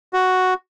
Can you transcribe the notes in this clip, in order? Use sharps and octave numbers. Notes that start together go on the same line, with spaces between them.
F#4